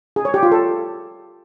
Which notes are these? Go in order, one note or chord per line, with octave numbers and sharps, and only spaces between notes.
G#4
C#5
G4
F4
A4